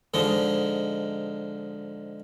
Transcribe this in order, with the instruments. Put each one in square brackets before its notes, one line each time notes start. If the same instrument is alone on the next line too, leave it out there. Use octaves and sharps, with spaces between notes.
[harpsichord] G#2 D3 F3 D#4